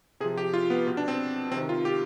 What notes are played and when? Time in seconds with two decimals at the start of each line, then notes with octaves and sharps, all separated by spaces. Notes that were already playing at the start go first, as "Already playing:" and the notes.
0.20 C3 G#4
0.24 F3
0.38 G4
0.53 F4
0.70 B3
0.87 B2
0.97 D4
1.08 C4
1.52 C3 D#3 C4
1.69 F4
1.85 G4